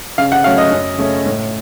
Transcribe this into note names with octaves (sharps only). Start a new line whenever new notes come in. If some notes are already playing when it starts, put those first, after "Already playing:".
C#3 F5
F#5
F#3 A3 C#4 F5
D#5
F#2
C#3 A3 C#4
A2